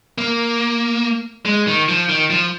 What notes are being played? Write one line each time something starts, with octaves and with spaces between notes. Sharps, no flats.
A#3
G#3
D#3
F3
D#3
F3